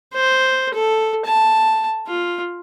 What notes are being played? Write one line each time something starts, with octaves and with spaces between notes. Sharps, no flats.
C5
A4
A5
F4